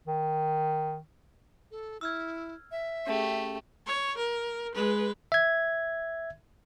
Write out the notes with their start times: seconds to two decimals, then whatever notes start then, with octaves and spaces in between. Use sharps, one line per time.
0.07 D#3
1.71 A4
2.01 E4 E6 F6 G#6
2.71 E5
3.07 A3 C#4 G4 G#4
3.86 C#5
4.17 A#4
4.74 G#3 B4
5.32 E5 G#6